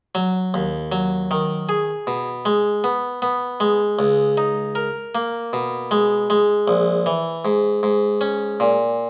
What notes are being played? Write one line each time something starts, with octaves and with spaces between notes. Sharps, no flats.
F#3
D#2
F#3
D#3
G#4
B2
G#3
B3
B3
G#3
C#2
D#4
A#4
A#3
B2
G#3
G#3
A#1
E3
G#2
G#2
C#4
A#2